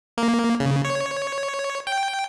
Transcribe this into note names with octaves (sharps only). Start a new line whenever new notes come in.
A#3
C#3
C#5
G5